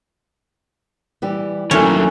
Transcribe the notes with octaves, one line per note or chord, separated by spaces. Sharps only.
E3 G3 G4
D#2 D#3 F#3 A3 C#4 E4 C#5